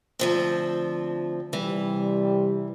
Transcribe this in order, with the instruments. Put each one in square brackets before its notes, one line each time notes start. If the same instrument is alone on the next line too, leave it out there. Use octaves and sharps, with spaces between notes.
[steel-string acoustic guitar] D2 F3 C4
[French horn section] C3 G3 [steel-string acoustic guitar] E3